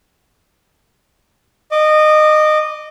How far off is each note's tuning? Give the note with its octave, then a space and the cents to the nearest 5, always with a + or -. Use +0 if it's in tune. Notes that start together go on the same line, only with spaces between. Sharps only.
D#5 -20 D6 +0